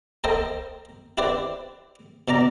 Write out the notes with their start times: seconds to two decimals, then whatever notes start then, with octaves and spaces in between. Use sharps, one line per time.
0.24 A4 A#4 C5 D#5 G5 A5
1.18 E4 G4 B4 C5 D5
2.28 B2 D4 D5 A#5